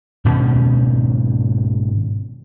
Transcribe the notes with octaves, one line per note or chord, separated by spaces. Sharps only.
G#2 B2 D#3 C#4